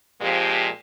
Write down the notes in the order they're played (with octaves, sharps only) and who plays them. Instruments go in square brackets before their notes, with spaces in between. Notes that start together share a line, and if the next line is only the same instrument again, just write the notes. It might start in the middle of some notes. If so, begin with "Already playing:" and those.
[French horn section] A#2 F3 G#3 C4 G4